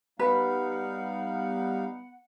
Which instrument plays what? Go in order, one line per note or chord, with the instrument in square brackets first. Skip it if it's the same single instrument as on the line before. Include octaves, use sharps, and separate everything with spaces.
[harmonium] G3 D#4 F5 [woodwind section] B3 F#5 [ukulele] B4